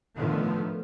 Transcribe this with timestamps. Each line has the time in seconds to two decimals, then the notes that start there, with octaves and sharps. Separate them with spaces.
0.15 A2 D3 D#3 F3 A3 B3